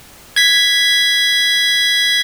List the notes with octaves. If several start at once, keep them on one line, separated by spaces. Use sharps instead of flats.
G#6 B6